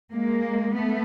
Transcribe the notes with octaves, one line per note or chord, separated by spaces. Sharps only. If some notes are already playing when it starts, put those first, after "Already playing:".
G#3 A#3
A3 B3